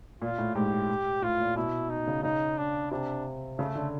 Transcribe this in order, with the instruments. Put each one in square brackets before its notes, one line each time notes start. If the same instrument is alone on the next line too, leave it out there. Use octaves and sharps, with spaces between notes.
[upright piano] A#2 [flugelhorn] F4
[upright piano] A2
[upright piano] G#2 [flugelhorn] G4
[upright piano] A2 [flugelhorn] F4
[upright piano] A#2
[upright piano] B2 [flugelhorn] E4
[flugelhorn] D#4
[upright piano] C#3
[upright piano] C#3 [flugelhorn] D#4
[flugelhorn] D4
[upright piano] C3 [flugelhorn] D4
[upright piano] C#3 [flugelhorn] A3
[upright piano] D3